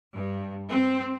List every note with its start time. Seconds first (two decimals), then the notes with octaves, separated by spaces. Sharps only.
0.15 G2
0.69 C4